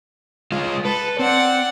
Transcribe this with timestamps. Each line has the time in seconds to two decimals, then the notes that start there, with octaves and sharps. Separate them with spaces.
0.52 G#3 F4
0.85 A4 B4
1.19 C4 D5 F#5